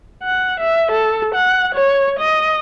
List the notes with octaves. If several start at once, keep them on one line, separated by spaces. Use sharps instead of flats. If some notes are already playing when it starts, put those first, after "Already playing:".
F#5
E5
A4
F#5
C#5
D#5